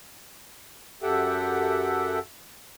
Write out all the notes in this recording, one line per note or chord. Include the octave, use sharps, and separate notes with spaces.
F#2 G4 A4 E5 F#5 G5